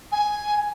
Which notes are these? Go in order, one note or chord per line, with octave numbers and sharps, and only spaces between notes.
G#5